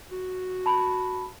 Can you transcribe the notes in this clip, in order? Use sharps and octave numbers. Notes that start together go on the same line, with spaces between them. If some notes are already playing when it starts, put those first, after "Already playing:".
F#4
A5 B5